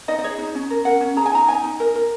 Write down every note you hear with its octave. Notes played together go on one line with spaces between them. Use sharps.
D#4 D#5
D#5
G#4 C#5
D#4
C#4
A#4
A#4 F#5
C#4
G#4 A#5
G#5
D#4 A#5
D#4 G#5
D#4
A#4
A#4